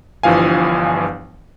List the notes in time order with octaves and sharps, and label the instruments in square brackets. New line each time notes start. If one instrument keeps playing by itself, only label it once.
[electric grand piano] G1 G2 E3 F3 F5 G#5